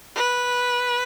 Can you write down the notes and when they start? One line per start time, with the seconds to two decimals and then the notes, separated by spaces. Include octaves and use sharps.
0.16 B4